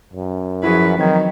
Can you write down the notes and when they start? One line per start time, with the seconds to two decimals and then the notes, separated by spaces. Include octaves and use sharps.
0.13 F#2
0.63 F3 E4 F#4 G#4 B4
0.98 D#3 E3 F#3 C4 G#6